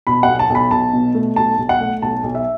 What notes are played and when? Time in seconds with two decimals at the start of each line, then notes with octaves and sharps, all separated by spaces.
0.07 B2 B5
0.23 B1 F#5
0.39 A5
0.50 B1
0.55 B5
0.71 B1 A5
0.93 B2
1.15 A3
1.36 B1 A5
1.58 B1
1.69 F#5
1.80 A3
2.02 B1 A5
2.24 B1
2.35 E5